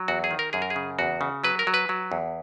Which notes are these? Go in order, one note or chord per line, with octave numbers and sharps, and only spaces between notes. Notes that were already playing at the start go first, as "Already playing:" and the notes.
Already playing: F#3
E2 F#4
G#4
D#3
A#4
F#2 G#4
A#4
G#4
C#3
E2 F#4
C#3
F#3 B4
A#4
F#3
B4
F#3
E2